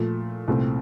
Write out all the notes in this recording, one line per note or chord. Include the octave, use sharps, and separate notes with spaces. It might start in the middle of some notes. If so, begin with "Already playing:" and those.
Already playing: A#2 F3 A3
C2 A#2 A3 C4